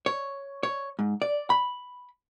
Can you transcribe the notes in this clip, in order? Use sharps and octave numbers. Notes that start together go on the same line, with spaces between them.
C#5
C#5
G#2
D5
B5